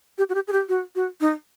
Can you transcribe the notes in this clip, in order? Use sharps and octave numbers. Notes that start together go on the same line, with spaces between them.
G4
F#4
G4
G#4
G4
F#4
F#4
D#4